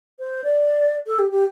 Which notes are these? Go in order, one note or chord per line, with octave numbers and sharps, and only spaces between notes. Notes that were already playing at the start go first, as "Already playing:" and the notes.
C5
D5
A4
G4
G4